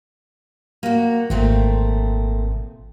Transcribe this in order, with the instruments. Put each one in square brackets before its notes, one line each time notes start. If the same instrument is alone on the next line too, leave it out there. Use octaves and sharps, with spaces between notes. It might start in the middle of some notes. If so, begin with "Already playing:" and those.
[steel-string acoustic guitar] A#3 F#4
[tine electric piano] G#1 [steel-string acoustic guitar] A#2 A3 C4